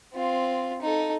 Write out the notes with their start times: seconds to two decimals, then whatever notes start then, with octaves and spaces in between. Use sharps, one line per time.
0.14 C4 F4
0.82 D#4 A4